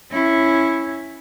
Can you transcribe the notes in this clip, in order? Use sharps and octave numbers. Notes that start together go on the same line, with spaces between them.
C#4 E4